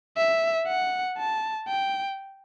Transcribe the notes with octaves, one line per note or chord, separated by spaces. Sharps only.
E5
F#5
A5
G5